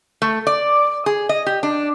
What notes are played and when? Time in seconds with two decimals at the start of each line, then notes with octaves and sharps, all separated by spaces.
0.22 A3
0.47 D5
1.06 G#4
1.29 D#5
1.46 G4
1.63 D4